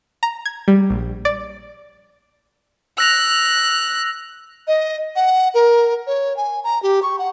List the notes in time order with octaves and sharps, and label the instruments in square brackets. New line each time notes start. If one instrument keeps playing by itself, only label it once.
[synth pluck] A#5
G#6
G3
A#1
D5
[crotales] E6 A#6 F7 [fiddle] F#6
[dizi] D#5
F#5
A#4
C#5
G#5
A#5
G4
C#6
F#5